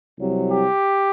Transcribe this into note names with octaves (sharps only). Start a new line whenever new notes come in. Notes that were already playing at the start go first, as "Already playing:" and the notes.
C2 C3 F#3
G4